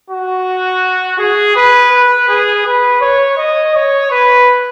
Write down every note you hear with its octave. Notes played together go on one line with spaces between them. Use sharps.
F#4
G#4
B4
B4
G#4
B4
C#5
D#5
C#5
B4